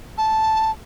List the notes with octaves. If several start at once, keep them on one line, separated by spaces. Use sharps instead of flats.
A5